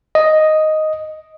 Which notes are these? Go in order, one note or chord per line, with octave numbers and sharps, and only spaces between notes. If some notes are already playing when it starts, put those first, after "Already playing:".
D#5